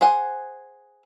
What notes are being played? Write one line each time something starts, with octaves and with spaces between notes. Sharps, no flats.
G#4 C5 F#5 G#5